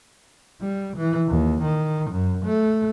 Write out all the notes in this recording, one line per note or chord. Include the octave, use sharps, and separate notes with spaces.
G3
E3
D#2
D#3
F#2
A3